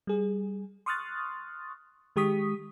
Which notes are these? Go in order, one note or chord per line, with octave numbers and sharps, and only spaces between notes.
G3 G#4
C6 C#6 D#6 F6 F#6 A6
D#3 G#3 G4 C#6 D#6 B6